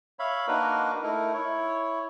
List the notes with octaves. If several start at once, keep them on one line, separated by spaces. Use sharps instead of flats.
C#5 E5 F5 B5
A#3 D4 D#4 F#4 A#4 B4
A3 D#4 E4 A#4
E4 C#5